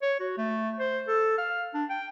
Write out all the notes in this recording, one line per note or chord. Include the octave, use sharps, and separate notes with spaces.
C#5
F#4
A3
C5
A4
F5
D4
G5